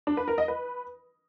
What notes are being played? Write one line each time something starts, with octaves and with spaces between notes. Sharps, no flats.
D4
B4
A#4
D#5
B4